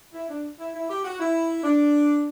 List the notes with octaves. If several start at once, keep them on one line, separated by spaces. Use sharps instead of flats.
E4
D4
E4
E4
G4
F#4
E4
D4